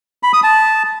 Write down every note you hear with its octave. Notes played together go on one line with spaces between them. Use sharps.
B5
D#6
A5